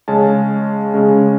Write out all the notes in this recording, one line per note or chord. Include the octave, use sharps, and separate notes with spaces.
C#3 G#3 C#4 A5
C#3 G#3 C#4